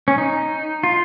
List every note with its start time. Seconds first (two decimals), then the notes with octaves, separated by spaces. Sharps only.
0.08 C#4
0.18 D#4
0.83 F4